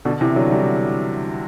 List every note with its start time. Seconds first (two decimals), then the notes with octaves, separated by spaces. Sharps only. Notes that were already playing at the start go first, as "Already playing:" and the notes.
0.05 B2 D3
0.21 C3 E3
0.36 D3 F#3
0.51 E3 G3